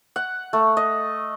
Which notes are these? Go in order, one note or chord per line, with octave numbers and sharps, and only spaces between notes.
F#5
A3
D#5